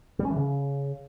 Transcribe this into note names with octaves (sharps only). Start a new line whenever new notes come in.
G3
C#4
E3
C#3